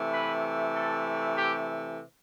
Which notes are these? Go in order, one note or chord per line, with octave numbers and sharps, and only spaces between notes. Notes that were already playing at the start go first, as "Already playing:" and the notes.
Already playing: C3 E3 A3
B4
A4
G4